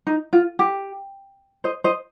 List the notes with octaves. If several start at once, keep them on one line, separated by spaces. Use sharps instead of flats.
D#4
F4
G4
C5 D#5
C5 D#5